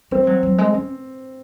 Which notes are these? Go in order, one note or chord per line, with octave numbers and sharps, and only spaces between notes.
G#3 C4
F#3
F#3
G#3
C#4